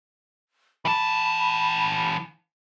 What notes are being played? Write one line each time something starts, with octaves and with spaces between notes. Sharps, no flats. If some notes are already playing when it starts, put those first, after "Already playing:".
E3 A5 B5